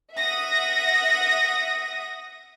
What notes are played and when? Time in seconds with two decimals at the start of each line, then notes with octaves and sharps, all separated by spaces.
0.15 E5 F#5 D#6 A#6